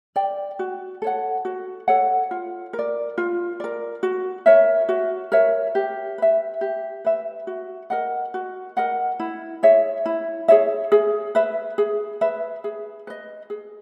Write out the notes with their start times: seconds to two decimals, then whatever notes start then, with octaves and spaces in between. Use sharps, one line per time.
0.16 D5 G5
0.59 F#4
1.02 A4 C#5 F#5
1.45 F#4
1.88 A4 C#5 F#5
2.31 F4
2.73 A#4
2.79 D5
3.18 F4
3.60 A#4 D5
4.03 F#4
4.46 A#4 C#5 E5
4.89 F#4
5.32 A#4 C#5 E5
5.75 G4
6.18 B4 E5
6.61 G4
7.05 B4 E5
7.47 F#4
7.90 A#4 D#5 F#5
8.34 F#4
8.77 A#4 D#5 F#5
9.20 E4
9.63 G#4 C#5 E5
10.06 E4
10.48 G#4 C#5 E5
10.92 G#4
11.35 B4 E5
11.78 G#4
12.21 B4 E5
12.64 G#4
13.07 B4 D#5
13.50 G#4